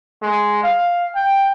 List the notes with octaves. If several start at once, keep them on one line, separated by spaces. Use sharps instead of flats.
G#3
F5
G5